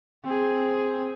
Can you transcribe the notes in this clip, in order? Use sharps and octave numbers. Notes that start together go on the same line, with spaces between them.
C4 G#4